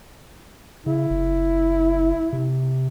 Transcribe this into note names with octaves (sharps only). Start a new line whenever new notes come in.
C#3 E4
F#1
C3